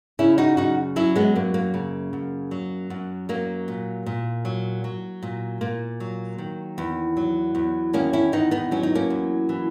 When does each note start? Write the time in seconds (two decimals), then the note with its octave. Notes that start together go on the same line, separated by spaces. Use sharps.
0.19 C#3 C#4 E4
0.38 D#4 F#4
0.57 F#2 D#4 F#4
0.96 F#3 C#4 E4
1.16 G#3 B3
1.36 F#2 A#3
1.54 A#3
1.74 C#3
2.13 F#2
2.51 F#3
2.90 F#2
3.29 F#3 A#3
3.68 A#2
4.06 A#2
4.45 F#3
4.84 F#3
5.23 A#2
5.61 A#2 A#3
6.00 F#3
6.38 D#3
6.78 E2
7.17 F#3
7.55 E2
7.93 D#3 A#3 C#4
8.13 C#4 E4
8.32 E2 B3 D#4
8.51 B3 D#4
8.71 F#3 C#4
8.83 D#4
8.95 A#3 C#4
9.10 E2
9.49 E3